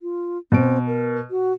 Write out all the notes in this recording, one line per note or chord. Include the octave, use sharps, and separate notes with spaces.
F4
B2 C4 D7
A#4
F#4